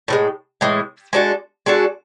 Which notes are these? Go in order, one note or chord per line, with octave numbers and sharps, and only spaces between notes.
A2 E3 G#3
A2 E3 G#3
G#3 D4 F#4 A4
G#3 D4 F#4 A4